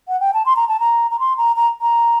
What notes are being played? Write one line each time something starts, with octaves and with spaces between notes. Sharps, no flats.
F#5
G5
A5
C6
A#5
A5
A#5
A#5
C6
A#5
A#5
A#5